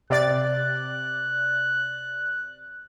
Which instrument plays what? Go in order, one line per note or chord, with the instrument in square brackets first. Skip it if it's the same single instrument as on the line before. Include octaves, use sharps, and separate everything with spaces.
[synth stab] C3 D5 A6 [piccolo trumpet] F#6